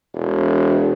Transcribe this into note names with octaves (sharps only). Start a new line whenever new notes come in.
E1